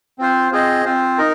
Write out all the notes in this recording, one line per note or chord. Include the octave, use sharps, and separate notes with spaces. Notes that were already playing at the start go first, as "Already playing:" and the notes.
C4 F4 C5
C4 F4 G#4 C5 D#5
C4 F4 C5
D#4 A#4